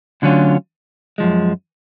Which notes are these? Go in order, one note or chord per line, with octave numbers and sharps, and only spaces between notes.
D2 D3 F#3 C#4 F4
F#2 F3 G#3